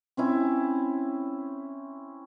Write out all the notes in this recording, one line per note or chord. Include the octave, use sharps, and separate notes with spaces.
C4 C#4 E4